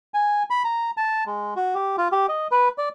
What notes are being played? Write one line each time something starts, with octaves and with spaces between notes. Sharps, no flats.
G#5
B5
A#5
A5
G#3
F#4
G4
F4
G4
D#5
B4
D5